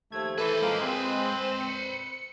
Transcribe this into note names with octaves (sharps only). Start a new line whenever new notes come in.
D#2 F3 A3 G#6
E3 A4 B4 C5
F3 G#3 A#3
C4
C#7